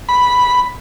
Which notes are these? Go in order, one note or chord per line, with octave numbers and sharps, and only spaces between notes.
B5